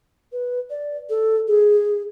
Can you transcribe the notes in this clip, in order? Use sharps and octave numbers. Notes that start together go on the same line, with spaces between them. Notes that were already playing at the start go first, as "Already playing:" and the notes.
B4
D5
A4
G#4